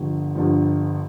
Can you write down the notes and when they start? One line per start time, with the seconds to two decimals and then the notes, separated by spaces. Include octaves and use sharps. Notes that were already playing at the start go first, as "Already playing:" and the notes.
Already playing: G1 G2 D3 F3
0.35 G1 G2 D3 F3